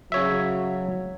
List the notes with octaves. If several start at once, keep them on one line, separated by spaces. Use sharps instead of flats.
C#3 F#3 C#5 E5